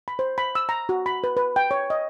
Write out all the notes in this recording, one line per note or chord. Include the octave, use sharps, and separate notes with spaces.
B5
C5
B5
E6
A#5
F#4
B5
B4
B4
G5
C#5
D#5